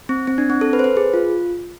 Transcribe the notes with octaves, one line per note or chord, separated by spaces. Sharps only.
C4
C4
D4
C4
A4
B4
C5
B4
G#4
F4